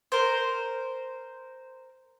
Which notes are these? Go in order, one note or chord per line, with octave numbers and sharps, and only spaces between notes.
A#4 C5